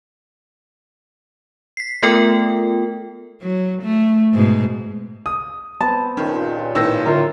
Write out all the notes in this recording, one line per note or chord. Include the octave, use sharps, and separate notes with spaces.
B6 C7
A3 B3 F4 A4 A#4 G5
F#3
A3
G#2 B2
D#6
B3 C4 A5
C#2 G2 A#2 D#3 C#4
A2 D#3 B3 E6 A#6
F#2 D3 F4 A#4